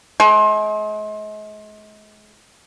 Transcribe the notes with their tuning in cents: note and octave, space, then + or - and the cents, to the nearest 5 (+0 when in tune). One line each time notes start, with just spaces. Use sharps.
G#3 +40